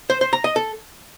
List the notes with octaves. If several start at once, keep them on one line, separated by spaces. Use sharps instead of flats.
C5
C5
A#5
D#5
A4